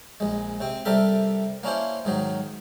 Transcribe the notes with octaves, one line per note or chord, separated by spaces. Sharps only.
A#1 G#3
C3 C4
C3 G3 A4 A#4 E5
A#3 C#4 D4 E4 C5
G#2 D#3 F#3